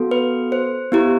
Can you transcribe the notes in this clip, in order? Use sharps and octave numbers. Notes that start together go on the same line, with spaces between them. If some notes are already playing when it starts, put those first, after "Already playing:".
Already playing: B3 F#4 A4
B4
C5
B3 E4 G4